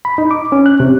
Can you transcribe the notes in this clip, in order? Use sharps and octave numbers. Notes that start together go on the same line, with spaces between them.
B5
D#4
D6
C#4
F#6
C3